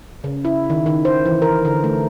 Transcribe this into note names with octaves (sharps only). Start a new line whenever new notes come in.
C#3
E4
D#3
D#3
C5
E3
A#4
D3
A3